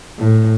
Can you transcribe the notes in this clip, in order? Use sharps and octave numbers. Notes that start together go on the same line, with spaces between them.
A2